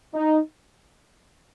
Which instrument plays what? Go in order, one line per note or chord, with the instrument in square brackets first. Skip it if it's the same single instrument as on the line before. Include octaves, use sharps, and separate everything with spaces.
[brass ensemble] D#4